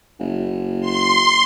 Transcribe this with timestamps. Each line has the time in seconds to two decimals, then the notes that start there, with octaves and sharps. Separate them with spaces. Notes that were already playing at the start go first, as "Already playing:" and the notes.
0.20 F#1
0.81 C6